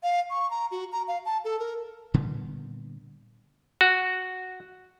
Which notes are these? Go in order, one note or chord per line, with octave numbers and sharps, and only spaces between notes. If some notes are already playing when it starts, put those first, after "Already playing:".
F5
C#6
A#5
F#4
A#5
F5
A5
A4
A#4
A#2 D3 G3 B3
F#4